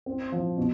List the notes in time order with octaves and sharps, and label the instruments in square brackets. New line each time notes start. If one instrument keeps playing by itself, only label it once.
[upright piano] C4
F3
B2